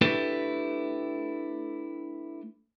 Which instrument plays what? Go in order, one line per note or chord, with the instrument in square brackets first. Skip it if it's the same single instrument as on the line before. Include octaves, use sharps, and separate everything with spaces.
[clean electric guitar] A3 D4 E4 G4 A4 B4